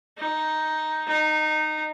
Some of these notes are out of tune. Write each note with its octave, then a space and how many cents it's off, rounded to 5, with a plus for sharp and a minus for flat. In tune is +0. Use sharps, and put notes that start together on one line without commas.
D#4 +5
D#4 -15